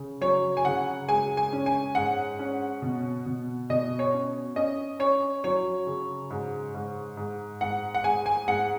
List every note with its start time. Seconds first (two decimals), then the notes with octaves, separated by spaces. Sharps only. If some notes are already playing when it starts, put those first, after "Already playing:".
Already playing: C#3
0.21 F#3 C#5
0.57 G#5
0.65 C#3 F#5
1.08 G#3 G#5
1.37 G#5
1.52 C#4
1.66 G#5
1.95 G#2 F#5
2.39 C#4
2.82 B2
3.26 B2
3.70 B2 D#5
3.99 C#5
4.13 C#4
4.56 C#4 D#5
4.99 C#4 C#5
5.44 F#3 C#5
5.87 C#3
6.30 G#2
6.74 G#2
7.17 G#2
7.61 G#2 F#5
7.94 F#5
8.04 G#3 G#5
8.26 G#5
8.48 G#2 F#5